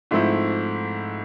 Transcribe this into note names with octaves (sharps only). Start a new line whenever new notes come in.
G#2 F3 A3 C4 E4